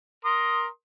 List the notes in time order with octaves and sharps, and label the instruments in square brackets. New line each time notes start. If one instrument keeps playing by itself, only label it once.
[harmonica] A#4 C6 D#6